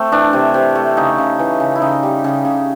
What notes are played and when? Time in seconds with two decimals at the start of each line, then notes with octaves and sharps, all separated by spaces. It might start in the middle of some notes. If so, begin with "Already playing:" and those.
Already playing: A3 C4
0.12 E3 D4
0.33 C3
0.54 C3
0.75 A3
0.97 C#3 D#4
1.18 C#3
1.39 E3
1.60 C#3
1.75 E4
1.82 C#3 D#4
2.03 G3
2.24 C#3
2.45 C#3